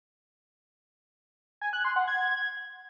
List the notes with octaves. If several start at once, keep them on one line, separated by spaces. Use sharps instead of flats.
G#5
F#6
C6
F#5
G#6